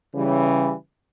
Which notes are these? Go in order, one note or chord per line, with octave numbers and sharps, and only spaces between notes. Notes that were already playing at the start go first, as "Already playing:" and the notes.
C#3 E3 G3